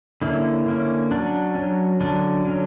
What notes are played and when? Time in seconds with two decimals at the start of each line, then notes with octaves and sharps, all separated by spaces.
0.22 D3 A#3 C#4 E4
0.66 D3 A#3 C#4
1.11 F#3 C#4 D4
1.55 F#3 C#4
2.00 D3 F#3 C#4 D4
2.45 D3 F#3 C#4